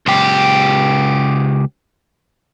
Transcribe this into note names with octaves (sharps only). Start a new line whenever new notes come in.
C#2 G4